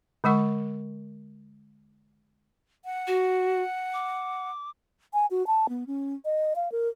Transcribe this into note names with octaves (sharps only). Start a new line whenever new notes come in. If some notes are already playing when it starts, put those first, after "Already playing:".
D3 G#3 A#4 F#5 C#6
F#5
F#4
D6
G#5
F#4
A5
B3
C#4
D#5
F5
A#4